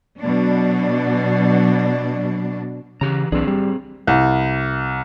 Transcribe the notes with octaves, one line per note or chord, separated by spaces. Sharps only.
B2 F#3 D4
C#3 E3 G4 A#5
B1 E3 C4 D4 G#4
G3
C2